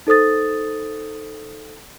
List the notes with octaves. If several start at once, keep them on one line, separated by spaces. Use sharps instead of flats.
D#4 A4 C5 D#6 A6